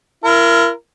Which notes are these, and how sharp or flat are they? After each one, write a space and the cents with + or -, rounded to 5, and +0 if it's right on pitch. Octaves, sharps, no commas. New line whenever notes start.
E4 +45 A#4 +0